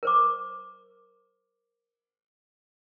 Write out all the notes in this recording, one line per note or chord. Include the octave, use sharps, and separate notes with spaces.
A#4 C5 D6